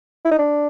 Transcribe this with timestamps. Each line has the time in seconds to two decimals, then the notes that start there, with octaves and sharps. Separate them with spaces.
0.25 E4
0.31 D#4
0.39 D4